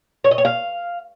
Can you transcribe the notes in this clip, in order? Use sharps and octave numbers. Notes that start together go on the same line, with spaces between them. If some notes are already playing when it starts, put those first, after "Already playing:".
C#5
D#5
C#5
F5